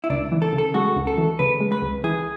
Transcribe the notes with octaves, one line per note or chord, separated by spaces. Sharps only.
E4
C#2 D4
E3
A4
C#3
A4
G#3 F#4
C#2
A4
E3
C#3 B4
G#3
B4
C#2
E3 G#4